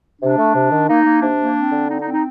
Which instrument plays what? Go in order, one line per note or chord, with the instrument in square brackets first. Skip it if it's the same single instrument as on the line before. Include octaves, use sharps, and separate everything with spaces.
[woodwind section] C3 D4
A3
C3
D#3
A#3 D#4
A#3
C3 D4
A#3
C4
D3
C4 D#4
D#4
C4
D#4